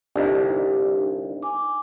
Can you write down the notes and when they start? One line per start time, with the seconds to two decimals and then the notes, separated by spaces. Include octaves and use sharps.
0.16 G1 C2 D4 D#4 G4
1.43 G#5 D6